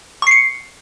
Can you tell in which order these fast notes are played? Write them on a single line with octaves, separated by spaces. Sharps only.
C#6 C7 C#7